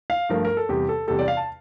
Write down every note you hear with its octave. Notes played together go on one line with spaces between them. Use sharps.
F5
G2 F3 A3 A#4
A#4
A4
E2 C3 G3 G4
A4
E2 C3 G3 A4
D5
F5
A5